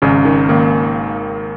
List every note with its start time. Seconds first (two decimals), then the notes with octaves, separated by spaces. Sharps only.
0.02 G#1 C#3 C#4
0.25 D#3
0.49 G#1 A#3